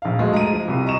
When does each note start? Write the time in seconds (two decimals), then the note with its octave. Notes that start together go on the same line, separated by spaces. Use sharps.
0.02 A#1 F5
0.19 F#3 G#3 A3
0.33 A#5 D#7
0.52 F3
0.68 C2
0.85 D#5 A#5 C#6 E7